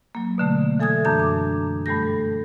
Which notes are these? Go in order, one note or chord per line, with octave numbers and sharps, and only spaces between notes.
F#3 A#3
B2 D3 A3
E3 A4 G#5 D#6 G#6
F#2 D4 A5 G6
D6
G2 G3 A3 A4 G6 A#6